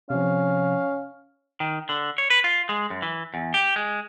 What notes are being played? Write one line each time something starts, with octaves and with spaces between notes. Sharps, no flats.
C3 F3 C#4 F5
D#3
D3
C#5
B4
F4
G#3
F#2
E3
E2
G4
G#3